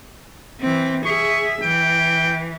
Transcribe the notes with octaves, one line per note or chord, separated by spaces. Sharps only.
E3 C4
G#4 E5 C#6
E3 G5